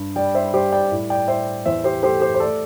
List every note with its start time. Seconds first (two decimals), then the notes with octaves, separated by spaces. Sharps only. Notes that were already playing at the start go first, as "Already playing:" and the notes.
Already playing: G2
0.16 G3 D5 G5
0.35 C5 E5
0.53 G3 G4 C5
0.72 D5 G5
0.92 A2
1.10 D5 G5
1.28 A2 C5 E5
1.66 E2 C5 E5
1.84 G4 C5
2.03 A3 G4 C5
2.21 G4 C5
2.34 C5
2.40 A3 A4 D5